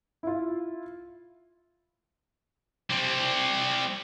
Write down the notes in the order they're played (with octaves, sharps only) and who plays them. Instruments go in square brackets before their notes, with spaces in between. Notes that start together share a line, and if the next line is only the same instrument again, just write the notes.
[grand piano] E4 F4
[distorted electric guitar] G3 C4